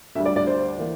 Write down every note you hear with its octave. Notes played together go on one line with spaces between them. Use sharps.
D2 D3 G3 E5
D5
D5
C5
E3 A#3